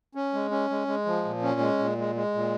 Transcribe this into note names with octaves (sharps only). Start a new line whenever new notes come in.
C#4
G#3
C#4
G#3
G#3
F3
A#2
C#4
G#3
A#2
G#3
G#3
A#2